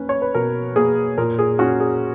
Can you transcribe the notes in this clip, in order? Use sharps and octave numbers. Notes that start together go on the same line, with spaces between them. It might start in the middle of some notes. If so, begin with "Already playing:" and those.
Already playing: A#3 C#4 B4
C#5
B4
B2 A#4
A#3 G#4
A#2 A#4
G#4
C#4 F#4
G#4